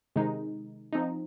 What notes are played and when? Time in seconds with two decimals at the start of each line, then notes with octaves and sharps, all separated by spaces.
0.16 C3 D#3 G#3 D#4
0.93 F3 C4 D#4